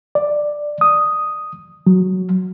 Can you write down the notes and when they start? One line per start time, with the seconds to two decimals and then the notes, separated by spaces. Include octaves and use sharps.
0.15 D5
0.81 D#6
1.87 F#3